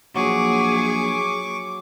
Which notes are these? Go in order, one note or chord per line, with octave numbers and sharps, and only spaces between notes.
A#1 F#3 G#4 C#6 D6